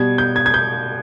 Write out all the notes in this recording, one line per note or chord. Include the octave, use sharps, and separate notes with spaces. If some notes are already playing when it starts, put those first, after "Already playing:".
Already playing: B2 G3 G#6
G6
G#6
G#6
G6